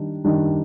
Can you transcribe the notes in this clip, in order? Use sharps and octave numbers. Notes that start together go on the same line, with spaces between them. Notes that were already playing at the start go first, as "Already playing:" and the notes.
Already playing: D#3 G3 D4
D#3 G3 D4